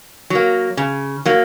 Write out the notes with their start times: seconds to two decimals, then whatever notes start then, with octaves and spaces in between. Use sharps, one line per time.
0.30 F#3 A#3
0.77 C#3
1.25 F#3 A#3